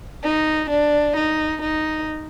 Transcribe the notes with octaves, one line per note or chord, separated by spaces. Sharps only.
D#4
D4
D#4
D#4